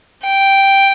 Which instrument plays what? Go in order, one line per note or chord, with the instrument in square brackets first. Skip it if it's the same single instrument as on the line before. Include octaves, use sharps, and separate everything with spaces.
[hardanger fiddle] G5